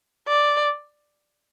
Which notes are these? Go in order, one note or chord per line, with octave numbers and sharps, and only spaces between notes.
D5